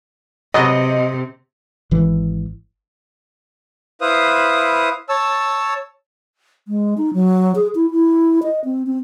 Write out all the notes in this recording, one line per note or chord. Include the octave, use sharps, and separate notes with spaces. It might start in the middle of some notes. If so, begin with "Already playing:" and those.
C3 F#3 G#3 B3 D#5
G#1 E3
E4 B4 C5 F5 D#6
C#5 A5 E6
G#3
D#4
F#3
G#4
E4
E4
D#5
C4
C4